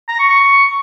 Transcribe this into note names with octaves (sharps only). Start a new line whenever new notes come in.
A#5
C#6
C#6